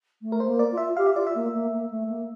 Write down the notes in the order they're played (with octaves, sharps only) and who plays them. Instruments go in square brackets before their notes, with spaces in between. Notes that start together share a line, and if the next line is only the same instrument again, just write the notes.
[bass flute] A3
[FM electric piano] A#4
C5
[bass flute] A#3
[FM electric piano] D5
[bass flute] F4
[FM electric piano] E5
[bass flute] G4 [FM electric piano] F5
[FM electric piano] E5
[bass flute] F4 [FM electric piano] D5
[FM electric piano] E5
[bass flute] A#3
A#3
A#3
A3
A#3